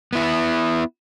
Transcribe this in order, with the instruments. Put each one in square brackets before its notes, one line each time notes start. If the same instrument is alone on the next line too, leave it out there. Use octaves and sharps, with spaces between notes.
[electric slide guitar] B3 E4